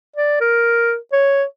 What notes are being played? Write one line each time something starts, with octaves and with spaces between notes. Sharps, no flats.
D5
A#4
C#5